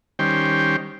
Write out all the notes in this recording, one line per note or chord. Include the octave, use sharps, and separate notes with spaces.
D#3 G3 C#4 C5 G5